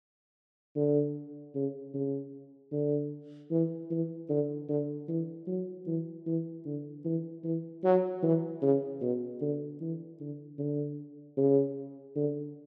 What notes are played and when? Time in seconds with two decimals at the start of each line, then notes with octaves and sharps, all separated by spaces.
0.76 D3
1.55 C#3
1.94 C#3
2.72 D3
3.51 E3
3.90 E3
4.29 D3
4.69 D3
5.08 E3
5.47 F#3
5.87 E3
6.27 E3
6.65 D3
7.05 E3
7.44 E3
7.84 F#3
8.23 E3
8.62 C#3
9.01 B2
9.41 D3
9.81 E3
10.20 D3
10.59 D3
11.37 C#3
12.16 D3